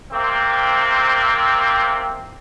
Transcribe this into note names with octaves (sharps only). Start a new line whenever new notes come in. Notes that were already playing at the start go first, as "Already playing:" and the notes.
C3 A#3 C4